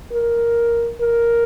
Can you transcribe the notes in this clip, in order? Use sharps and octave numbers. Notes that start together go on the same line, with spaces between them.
A#4
A#4